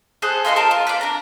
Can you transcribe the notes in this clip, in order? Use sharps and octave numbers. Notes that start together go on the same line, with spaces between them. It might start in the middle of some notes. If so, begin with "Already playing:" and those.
G#4 A4 C5 F#6
F4 A4 D#5 C6
F4 A#4 C5 A5
F4
B4 D5
D4 A#5